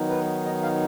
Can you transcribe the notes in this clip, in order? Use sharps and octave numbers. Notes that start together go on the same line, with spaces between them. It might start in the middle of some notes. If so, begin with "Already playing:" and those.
Already playing: D#3 F#3 B3 D#4
B4
D#5
F5